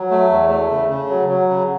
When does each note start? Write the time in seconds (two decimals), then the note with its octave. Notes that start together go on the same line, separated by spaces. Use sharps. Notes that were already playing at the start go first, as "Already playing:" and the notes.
Already playing: F#3
0.10 A3
0.30 E2
0.49 A3
0.70 C#3
0.89 C#3
1.09 F#3
1.28 F#3
1.49 C#3